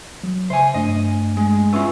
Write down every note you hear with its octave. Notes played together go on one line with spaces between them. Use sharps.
F#3
C#3 C5 E5 G#5
G2 A3 D4 D#5
G#3
B3 C#4 F4 E5 C#6 E6